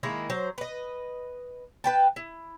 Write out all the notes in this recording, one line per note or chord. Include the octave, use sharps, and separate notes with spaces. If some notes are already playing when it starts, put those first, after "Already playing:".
D#3 G#3 A#3 E4
F#3 C5
B4 D#5
B4 G5 A5
E4